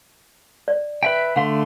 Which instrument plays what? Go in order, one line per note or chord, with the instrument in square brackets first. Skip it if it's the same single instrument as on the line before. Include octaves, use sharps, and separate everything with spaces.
[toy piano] D5
[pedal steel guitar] B4 E5 G5
[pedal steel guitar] D3 A3 C6 [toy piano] F5 F#5